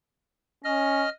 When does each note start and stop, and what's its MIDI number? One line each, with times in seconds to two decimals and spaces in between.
0.65 1.06 61
0.65 1.10 75
0.65 1.10 89